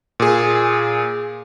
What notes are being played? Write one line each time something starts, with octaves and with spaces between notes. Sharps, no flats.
A#2 G#4